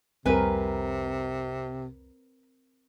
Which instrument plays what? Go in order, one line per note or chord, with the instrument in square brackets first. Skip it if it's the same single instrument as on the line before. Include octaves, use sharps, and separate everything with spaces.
[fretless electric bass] C2 F2 G3 [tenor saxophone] C3 [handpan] C4 A#4 [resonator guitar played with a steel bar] B4 G#5